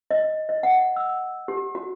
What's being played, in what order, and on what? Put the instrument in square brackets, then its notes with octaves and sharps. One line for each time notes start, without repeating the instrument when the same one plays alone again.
[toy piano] D#5
D#5
F#5
E6
G4
F#4